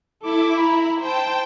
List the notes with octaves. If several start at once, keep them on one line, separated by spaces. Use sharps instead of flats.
E4 A4 D6
A#5 B5
C5 G5 A5